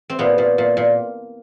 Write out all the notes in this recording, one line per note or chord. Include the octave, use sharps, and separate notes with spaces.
C4
A#2 B3
A#2
A#2
A#2